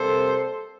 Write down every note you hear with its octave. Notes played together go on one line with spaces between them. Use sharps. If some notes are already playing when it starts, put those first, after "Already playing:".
Already playing: C3 G3 A#3 A4 C5